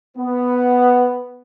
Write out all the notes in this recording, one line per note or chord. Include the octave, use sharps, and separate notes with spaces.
B3